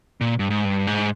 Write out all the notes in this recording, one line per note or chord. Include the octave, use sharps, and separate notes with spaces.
A#2
G2
G#2
G2
G#2